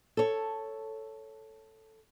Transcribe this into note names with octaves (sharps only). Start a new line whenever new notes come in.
A4 C#5